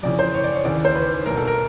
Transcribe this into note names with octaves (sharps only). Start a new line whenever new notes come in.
F2 C#3 E3 D5
C5
C#5
D5
C#5
D#2 C#3 E3 D5
C5
B4
C2 B2 A#4
A4
A#4